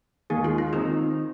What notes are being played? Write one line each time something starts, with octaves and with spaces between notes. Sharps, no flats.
D#2 D#3 G#3 G#4
F4
F4
D#3 C4 D#4